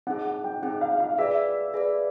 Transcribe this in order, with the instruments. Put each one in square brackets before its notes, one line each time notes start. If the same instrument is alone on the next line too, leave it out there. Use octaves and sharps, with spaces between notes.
[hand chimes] C4 D#4 G#4 [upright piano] F#5
[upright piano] F#5
G5
[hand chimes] C4 D#4 G#4 [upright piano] F#5
[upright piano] F5
F5
[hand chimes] G#4 B4 D5 [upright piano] E5
[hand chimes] G#4 B4 D5